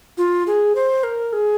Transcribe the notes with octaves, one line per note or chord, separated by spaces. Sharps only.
F4
G#4
C5
A#4
G#4